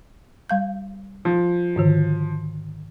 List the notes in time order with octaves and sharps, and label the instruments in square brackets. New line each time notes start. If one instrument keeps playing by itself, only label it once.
[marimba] G3 F5 G6
[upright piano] F3
[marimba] G#2 D3 D#3